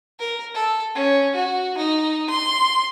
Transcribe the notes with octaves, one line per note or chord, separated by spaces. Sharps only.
A#4
A4
C#4
F#4
D#4
C6